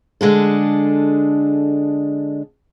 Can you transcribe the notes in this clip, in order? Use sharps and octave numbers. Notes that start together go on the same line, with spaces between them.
D3 G#3 D4 A4